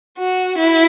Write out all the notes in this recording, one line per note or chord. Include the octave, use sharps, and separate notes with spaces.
F#4
E4